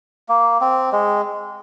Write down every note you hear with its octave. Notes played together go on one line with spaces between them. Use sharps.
A#3
C4
G#3